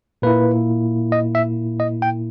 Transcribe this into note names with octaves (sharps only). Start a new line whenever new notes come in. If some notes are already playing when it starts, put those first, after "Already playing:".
A#2 A#3 E4 B4
D#5
E5
D#5
G5